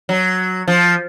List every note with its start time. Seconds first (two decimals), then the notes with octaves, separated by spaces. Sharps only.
0.09 F#3
0.68 F3